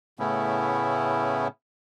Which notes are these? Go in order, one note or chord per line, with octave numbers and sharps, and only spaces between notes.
A2 C#3 A3 B3 C#4 E4